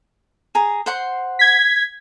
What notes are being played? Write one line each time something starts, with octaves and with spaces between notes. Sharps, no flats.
G#4 A#5
C5 F#5 C6
G#6 B6